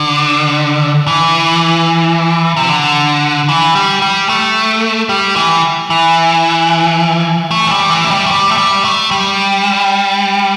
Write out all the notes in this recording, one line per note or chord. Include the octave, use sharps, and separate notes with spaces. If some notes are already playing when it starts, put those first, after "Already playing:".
Already playing: D3
E3
C3
D3
E3
G3
G3
A3
G3
E3
E3
A3
E3
G3
E3
A3
G3
A3
G3
A3
G3
A3
G3